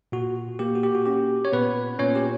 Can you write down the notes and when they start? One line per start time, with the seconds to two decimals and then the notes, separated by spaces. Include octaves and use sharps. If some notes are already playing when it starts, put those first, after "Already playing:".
0.12 A#2 F#4
0.59 A#3 G4
0.75 F#4
0.83 G4
0.95 F#4
1.06 C#4 G4
1.45 C#5
1.53 A#2 B3 B4
1.99 A#2 C#4 C#5
2.15 G4